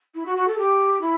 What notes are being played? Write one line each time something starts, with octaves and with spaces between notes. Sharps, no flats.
E4
F#4
F#4
A4
G4
E4